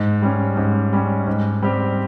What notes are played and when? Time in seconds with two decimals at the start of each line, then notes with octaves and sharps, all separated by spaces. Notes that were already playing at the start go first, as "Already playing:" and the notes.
Already playing: G#2
0.22 G3 C#4
0.57 G#2
0.93 G3 C#4
1.27 G#2
1.62 G3 C4 G4